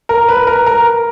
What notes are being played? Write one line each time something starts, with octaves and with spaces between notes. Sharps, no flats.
A#4
B4
A#4
A#4